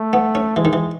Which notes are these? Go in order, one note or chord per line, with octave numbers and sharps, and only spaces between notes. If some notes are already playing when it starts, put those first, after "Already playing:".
Already playing: A3
B3
C#4
E3 G#3
D#3
E3